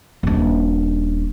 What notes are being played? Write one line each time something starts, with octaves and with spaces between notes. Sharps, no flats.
D#1 D4